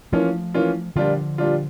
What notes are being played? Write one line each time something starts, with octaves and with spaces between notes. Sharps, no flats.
E3 F3 A3 A#3 C#4 F4
E3 A#3 C#4 F4
A#2 D3 F3 G3 D4 F4
A#2 G3 D4 F4